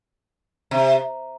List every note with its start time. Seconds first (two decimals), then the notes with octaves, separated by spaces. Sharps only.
0.71 C3